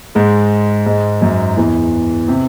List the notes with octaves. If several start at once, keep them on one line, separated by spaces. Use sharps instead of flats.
G#2 G#3
G#2 G#3
F#2 F#3
E2 E3
C3